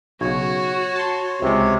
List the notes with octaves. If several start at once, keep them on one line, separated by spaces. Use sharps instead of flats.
B1 C#3 F#4 C#5
A5 C6
C#2 C3 G#3